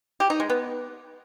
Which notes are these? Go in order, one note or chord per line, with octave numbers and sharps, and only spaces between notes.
G4
D#4
G#3
B3